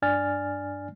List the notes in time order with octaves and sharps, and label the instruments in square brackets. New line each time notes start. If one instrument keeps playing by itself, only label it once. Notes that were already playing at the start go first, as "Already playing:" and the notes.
[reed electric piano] G2 D4 D5 G#5 F6 A6